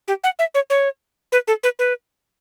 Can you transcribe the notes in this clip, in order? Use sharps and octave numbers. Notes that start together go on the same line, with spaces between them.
G4
F#5
E5
C#5
C#5
B4
A4
B4
B4